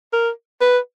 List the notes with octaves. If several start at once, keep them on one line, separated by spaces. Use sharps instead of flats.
A#4
B4